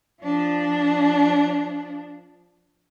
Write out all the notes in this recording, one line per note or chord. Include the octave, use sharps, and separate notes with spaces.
F3 D4